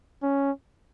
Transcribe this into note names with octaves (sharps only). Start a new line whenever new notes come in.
C#4